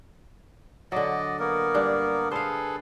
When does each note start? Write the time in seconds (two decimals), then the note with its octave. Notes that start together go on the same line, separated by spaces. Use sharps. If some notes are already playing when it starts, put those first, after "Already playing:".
0.92 D3 F#3 D5 D#5
1.39 A#3 B3 A#4
1.74 G2 D4
2.31 G#4 A4 B4 C5 F5